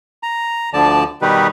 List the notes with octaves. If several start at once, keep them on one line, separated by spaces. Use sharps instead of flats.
A#5
D2 D3 F3 D5 A5
B2 D#3 G3 D#4 G4 B4